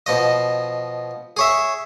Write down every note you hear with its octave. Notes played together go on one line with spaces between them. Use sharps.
B2 F3 D#5
G#4 C#5 E5